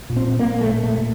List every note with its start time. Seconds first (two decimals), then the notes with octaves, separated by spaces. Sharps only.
0.10 A#2
0.16 C4
0.39 A#2 A#3
0.61 A3
0.68 A#2
0.83 A3
0.98 A#2